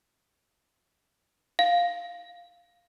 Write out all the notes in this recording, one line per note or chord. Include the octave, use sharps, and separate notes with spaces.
F5